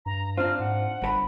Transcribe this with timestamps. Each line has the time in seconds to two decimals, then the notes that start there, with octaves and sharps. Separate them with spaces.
0.06 G2 A#5
0.37 C4 D4 F4 C5 F6
0.59 G#2 F#5
1.02 G1 G2 A#4 B5